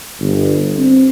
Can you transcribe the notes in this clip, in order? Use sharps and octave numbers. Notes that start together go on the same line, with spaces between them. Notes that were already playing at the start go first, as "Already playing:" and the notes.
G1
C4